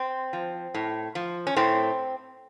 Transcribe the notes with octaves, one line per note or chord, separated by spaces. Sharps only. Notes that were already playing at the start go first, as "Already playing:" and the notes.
Already playing: C4
F3
A2
F3
C#4
A2 C4